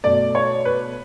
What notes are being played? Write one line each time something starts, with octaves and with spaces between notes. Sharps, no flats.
B2 A3 D5
C#5
B4